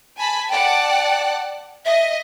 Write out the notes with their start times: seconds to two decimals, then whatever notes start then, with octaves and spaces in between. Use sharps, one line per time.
0.16 G#5 A5 B5
0.49 D5 F#5 G5 A5
1.85 D#5 E5